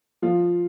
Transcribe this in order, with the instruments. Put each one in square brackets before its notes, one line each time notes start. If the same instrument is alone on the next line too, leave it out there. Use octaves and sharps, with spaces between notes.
[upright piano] F3 F4